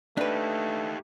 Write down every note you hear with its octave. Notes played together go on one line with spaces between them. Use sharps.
A3 D4 D#4 G4 B4